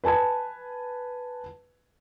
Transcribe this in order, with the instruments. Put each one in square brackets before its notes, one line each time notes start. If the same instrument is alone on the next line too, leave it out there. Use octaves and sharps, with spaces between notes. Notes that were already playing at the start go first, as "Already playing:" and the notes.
[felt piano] B4 G#5 A5 G#6